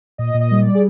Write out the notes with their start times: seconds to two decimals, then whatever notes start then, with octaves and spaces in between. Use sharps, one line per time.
0.18 A#2 D#5
0.34 A#2
0.40 D#5
0.51 G3
0.62 D5
0.67 G3
0.75 G#4